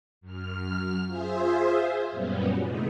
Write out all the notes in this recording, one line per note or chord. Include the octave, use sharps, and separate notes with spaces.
F#2 F6
F4 G#4 C5 E5
F#2 A#2 F#3 G3 B3 C#4
C3 D#3 E3 G#3 A3